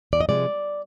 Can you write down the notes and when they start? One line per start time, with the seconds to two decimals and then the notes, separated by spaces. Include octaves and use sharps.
0.13 E2 D5
0.21 D#5
0.29 C3 F3 G#3 D5